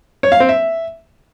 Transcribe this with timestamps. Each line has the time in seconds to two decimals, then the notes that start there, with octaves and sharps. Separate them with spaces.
0.23 C#5
0.32 F5
0.40 C4
0.49 E5